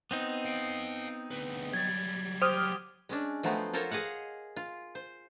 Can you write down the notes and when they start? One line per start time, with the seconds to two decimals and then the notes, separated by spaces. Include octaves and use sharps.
0.11 B3 C4 D#4
0.45 F5 G5
1.31 D2 B4
1.74 F#3 G3 G#6 A6
2.42 G4 C5 D#6 F6
3.09 G#3 C#4 D4
3.43 F3 F#3 A3 B3 C4
3.73 F4 A4 A#4 C5 C#5
3.91 G#4 D#5 F5 F#5
4.56 F4
4.95 C5